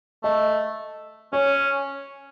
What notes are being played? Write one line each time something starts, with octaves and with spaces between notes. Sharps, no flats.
A3 D#5
C#4 C#5